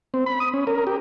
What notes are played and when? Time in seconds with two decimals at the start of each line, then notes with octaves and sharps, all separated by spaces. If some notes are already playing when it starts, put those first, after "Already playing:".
0.14 C4
0.26 B5
0.40 D#6
0.54 C#4
0.67 A#4
0.87 G4